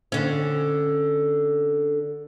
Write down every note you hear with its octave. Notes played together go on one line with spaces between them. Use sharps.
D3 C#4